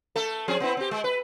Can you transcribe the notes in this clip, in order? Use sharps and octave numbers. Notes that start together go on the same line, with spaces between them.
A3 A4
F3 C4 G#4
B3 C4 E4
C4 G4
G#3
B4